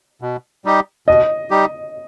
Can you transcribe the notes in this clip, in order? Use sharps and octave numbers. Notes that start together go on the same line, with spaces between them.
B2
G3 D#4 G4
B2 D#5
G3 D#4 G4